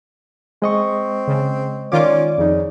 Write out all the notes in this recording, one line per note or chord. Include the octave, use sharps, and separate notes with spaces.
G#3 C4 D#5 C#6
C#3
D#3 C#4 F4 D5 D6
F2 C#3 D#4